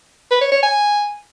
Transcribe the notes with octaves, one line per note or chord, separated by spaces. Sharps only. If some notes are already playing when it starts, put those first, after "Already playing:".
B4
C#5
C#5
G#5